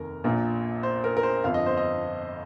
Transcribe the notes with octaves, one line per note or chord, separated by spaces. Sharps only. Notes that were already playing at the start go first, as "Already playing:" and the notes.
Already playing: F1 D#2 D#3 A#4
A#1 A#2 A#3
C5
A#4
A#4
C5
G1 F2 F3 F5
D#5
C5
D#5